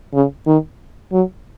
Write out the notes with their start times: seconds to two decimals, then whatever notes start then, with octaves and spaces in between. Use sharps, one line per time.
0.14 C#3
0.47 D#3
1.12 F#3